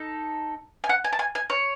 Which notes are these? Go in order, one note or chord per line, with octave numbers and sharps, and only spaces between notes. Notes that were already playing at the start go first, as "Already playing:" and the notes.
Already playing: D#4 A4
G#5
F#5
G#5
A5
G#5
G#5
C#5